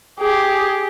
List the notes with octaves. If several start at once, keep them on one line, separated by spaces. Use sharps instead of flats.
G4 G#4